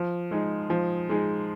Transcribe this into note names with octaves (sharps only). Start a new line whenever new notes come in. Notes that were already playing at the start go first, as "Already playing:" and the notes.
Already playing: F3
G#3 D#4 G#4
F3
G#3 D#4 G#4